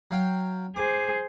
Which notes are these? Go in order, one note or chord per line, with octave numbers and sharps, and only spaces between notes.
F#3 F5 G5
G#4 C5 D6